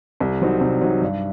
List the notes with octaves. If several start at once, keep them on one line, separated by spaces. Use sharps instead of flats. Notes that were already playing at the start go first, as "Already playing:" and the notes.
C2
C3 F#3 C4 D#4
C2
C3 F#3 C4 D#4
G2